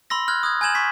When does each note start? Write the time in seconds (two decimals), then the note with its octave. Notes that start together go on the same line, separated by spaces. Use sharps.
0.10 B5 C6 E6 A#6
0.28 F6 F#6 G#6
0.43 D#6 F#6 G#6
0.61 G#5 G6 G#6 E7 F#7
0.75 C#6 B6